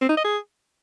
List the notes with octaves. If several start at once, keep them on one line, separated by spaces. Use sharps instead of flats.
C4
D#4
D#5
G#4